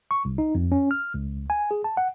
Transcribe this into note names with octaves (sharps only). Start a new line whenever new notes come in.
C#6
C2
D#4
F2
C#4
F6
C#2
G#5
G#4
A5
F#5